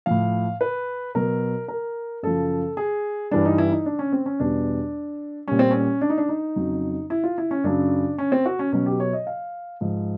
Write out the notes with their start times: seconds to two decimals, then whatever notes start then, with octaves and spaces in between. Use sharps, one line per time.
0.06 A2 F3 F5
0.61 B4
1.15 B2 F#3 A#4
1.68 A#4
2.23 F#2 C#3 F3 A4
2.77 G#4
3.31 G2 E3 G3 D4
3.45 D#4
3.58 E4
3.72 D#4
3.86 D4
3.99 C#4
4.12 C4
4.26 C#4
4.40 E2 B2 G3 D4
5.48 A#2 G3 C#4
5.59 C4
5.71 C#4
6.01 D4
6.10 D#4
6.18 D4
6.29 D#4
6.56 F2 C#3 F#3
7.10 E4
7.24 F4
7.38 E4
7.51 C#4
7.64 F#2 C#3 F#3 D4
8.18 C#4
8.32 C4
8.46 F#4
8.59 C#4
8.72 B2 F#3 C#4
8.86 G4
9.00 C#5
9.13 D#5
9.27 F5
9.81 G#2 F3